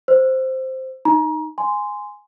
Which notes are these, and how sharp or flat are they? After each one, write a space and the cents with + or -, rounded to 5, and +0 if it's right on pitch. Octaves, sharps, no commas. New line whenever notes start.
C5 +0 E6 +30
D#4 -10 A#5 +30
G#5 +0 C6 -10